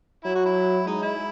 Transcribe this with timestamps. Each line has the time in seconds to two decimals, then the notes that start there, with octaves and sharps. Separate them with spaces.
0.25 F#3 E4
0.35 F#4
0.46 E4
0.87 G#3 D#4
1.02 E4